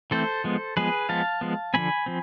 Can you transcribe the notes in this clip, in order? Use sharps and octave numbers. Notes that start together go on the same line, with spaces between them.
E3 A3 C4 A4 C5
F3 G#3 B3
F3 G#3 B3 G#4 B4
F3 G#3 B3 F5 A5
F3 G#3 B3
D3 F3 A3 C4 G#5 B5
F3 C4